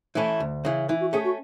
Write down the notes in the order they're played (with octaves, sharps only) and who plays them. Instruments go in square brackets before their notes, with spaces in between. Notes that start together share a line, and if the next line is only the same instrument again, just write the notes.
[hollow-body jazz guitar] E3 A3 C#4 E4
D2
C#3 E3
[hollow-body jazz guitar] E3 [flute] E4
[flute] F#4
[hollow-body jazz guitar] A3 C#4 [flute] G#4
[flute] F#4